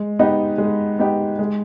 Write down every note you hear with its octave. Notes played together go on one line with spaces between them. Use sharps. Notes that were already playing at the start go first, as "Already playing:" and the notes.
Already playing: G#3
B3 D#4 G4
G#3
B3 D#4 G4
G#3